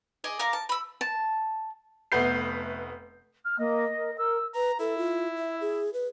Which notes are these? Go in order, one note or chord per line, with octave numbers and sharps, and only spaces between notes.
G#4 D5 D#5
A#4 D5 F5 A#5
A5
B5 E6
A5
F1 A3 B3 B4 G6 C7
F6
A#3 D#5
A#4
A#4 E6
B4 A#5
E4 A4
F4
E5
G#4
B4